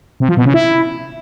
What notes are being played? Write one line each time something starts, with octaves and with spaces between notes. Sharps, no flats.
C3
F3
B2
C#3
E4